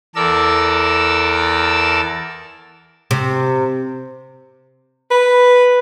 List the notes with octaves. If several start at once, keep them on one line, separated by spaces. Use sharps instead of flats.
E2 A4 A#4 D5 E6
C3
B4